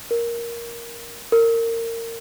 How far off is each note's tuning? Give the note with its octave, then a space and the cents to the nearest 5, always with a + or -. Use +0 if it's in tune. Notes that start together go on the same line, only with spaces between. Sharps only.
A#4 +5
A#4 -25